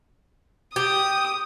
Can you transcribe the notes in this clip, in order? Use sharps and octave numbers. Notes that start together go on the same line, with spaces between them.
G4 D#6